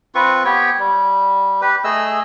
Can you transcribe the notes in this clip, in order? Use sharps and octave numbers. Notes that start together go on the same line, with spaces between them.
C4 F4 B4 C#6
B3 G4 C#5 G5
G3
G4 B4
A3 G#4 D#5 E6